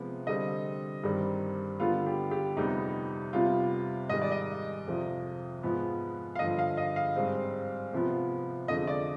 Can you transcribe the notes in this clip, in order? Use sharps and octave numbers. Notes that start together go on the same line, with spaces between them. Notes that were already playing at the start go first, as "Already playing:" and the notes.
Already playing: C3 F3 G#3 B3
D3 G3 C4 D#5
G2 D#3 G3 C4
D3 G3 B3 F4
G4
G4
F2 C3 G3 B3 D#4
C3 G3 B3 F4
G#2 D#3 G3 D#5
D5
D#5
F2 C3 F3
G#2 F3 B3
F5
G2 D3 F3 D#5
F5
D#5
F5
G#2 G3 C4
C3 F3 B3
F2 D3 F3 G#3 D#5
D5